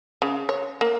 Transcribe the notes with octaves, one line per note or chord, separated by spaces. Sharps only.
C#3
C#5
A#3